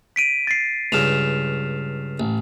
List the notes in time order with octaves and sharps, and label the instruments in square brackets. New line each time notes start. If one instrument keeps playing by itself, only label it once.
[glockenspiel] B6 D7 D#7
A6 C7
[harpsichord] C#2 G2 C#3 [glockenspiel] F6 E7 F7
[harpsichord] A1